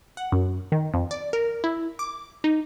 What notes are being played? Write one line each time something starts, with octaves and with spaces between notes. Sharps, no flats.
F#5
F#2
D#3
F2
D5
A#4
E4
D6
D#4